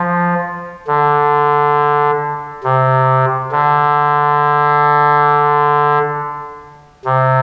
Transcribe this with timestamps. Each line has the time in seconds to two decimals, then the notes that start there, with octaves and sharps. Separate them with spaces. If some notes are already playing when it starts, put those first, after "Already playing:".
Already playing: F3
0.87 D3
2.64 C3
3.52 D3
7.05 C3